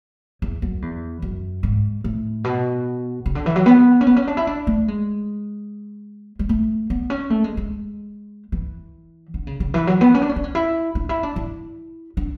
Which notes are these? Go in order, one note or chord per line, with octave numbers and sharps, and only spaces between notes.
E2
F#2
E2
F#2
G#2
A2
B2
C#3
D3
E3
F#3
B3
C#4
B3
C#4
D4
E4
D4
A3
G#3
G#3
A3
B3
C#4
A3
G#3
G#3
E3
D3
C#3
C#3
E3
F#3
B3
C#4
D4
C#4
D4
C#4
E4
D4
E4
D4
E4
D4